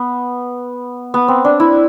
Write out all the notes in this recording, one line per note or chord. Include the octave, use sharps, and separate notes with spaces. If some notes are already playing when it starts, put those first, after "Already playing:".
Already playing: B3
B3
C4
D4
E4